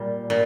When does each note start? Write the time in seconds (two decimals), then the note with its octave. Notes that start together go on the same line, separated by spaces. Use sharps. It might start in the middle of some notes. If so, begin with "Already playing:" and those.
Already playing: A#2 G3
0.30 A#2